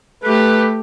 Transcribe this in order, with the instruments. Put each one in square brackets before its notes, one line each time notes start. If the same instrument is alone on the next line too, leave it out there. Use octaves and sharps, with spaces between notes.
[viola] A3 G4 [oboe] B4